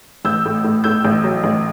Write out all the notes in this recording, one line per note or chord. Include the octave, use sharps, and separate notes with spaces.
A1 E6 G6
A2
A2
A2 E6 G6
A1
F#3
A1